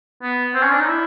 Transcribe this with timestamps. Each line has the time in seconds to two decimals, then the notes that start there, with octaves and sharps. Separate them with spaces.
0.22 B3
0.54 C4
0.62 C#4
0.71 D4
0.79 D#4
0.88 E4